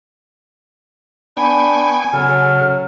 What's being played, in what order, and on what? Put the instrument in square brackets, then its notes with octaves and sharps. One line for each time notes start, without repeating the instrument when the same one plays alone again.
[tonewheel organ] B3 G5 C#6 [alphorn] D4 [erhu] G#5 [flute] B5
[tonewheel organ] C#3 A4 [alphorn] F#3 [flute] F6